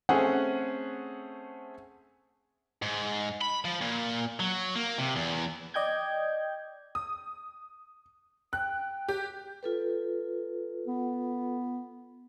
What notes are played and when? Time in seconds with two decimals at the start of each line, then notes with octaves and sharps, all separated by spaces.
0.09 A3 C4 C#4 G#4 F#5
2.82 G#2
3.42 B5
3.65 F3
3.81 A#2
4.40 F#3
4.76 A#3
4.98 C3
5.16 E2
5.74 D5 D#5 G5 G6 G#6
6.95 D#6
8.53 G5 F#6
9.08 G4
9.63 F4 A4 B4
10.87 B3